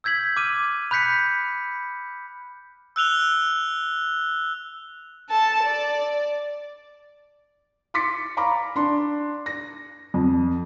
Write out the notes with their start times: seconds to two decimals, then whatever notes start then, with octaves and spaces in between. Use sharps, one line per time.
0.04 E6 G6 G#6 B6 F#7
0.37 D6 F6 D#7
0.91 B5 F#6 G6 B6 C#7
2.96 E6 F#6 F7 G7
5.30 A4 A5
5.64 D5
7.94 C6 D6 A6 B6 C#7
8.37 F5 A#5 B5 C#6 D6
8.76 D4 C6
9.46 A#6
10.14 F2